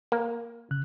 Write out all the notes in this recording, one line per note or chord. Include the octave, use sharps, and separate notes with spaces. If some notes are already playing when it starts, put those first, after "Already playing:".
A#3
C#3 F#6